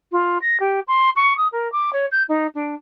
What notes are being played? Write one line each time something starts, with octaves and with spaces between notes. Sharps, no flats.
F4
A#6
G4
C6
C#6
D#6
A#4
D6
C#5
G6
D#4
D4